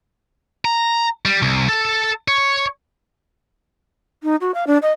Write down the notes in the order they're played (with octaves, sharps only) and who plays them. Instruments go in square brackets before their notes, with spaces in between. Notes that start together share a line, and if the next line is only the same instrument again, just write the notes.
[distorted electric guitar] A#5
G3
C2
A4
C#5
[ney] D#4
F#4
F5
D4
D#5